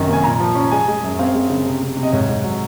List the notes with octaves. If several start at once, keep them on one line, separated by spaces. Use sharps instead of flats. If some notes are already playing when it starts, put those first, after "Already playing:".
Already playing: F#2 C3 D#3
A#3
G#5
A#2 A#5
F3
C#4
G#3 G#5
G#3
F#2
C4 F5
G#3
C#3
C3
C3
C3
D#5
G#2 C#5
G#2
F#3